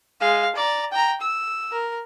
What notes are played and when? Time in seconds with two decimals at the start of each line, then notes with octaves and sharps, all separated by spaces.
0.21 G#3 F5
0.56 D5 A#5
0.92 G5 A#5
1.21 E6
1.72 A#4